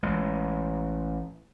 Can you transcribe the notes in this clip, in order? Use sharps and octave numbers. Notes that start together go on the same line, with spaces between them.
A1 G#3